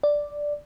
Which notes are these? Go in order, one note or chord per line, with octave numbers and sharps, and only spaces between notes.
D5